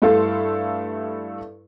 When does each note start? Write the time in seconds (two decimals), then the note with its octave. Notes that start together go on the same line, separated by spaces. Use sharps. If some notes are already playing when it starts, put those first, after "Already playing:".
0.02 G2 A3 E4 A4 F5 C6